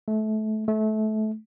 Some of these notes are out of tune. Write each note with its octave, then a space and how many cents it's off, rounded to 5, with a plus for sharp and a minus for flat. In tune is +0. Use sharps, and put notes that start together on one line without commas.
A3 -25
A3 -25